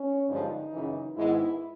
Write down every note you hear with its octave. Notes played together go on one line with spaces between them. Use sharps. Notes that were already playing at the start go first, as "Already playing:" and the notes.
Already playing: C#4
G2 D3 F3 G#3 D#4
F#2 C#3 E3
G#2 D#3 G#3 B3 E4